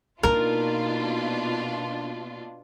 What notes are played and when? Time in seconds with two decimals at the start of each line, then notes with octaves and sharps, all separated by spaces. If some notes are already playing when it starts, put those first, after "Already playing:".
0.23 B2 A#3 D4 D#4 F4 A#4